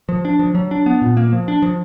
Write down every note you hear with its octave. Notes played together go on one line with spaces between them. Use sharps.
F3
D4
F3
F#3
D4
B3
A#2
A#3
F3
D4
F3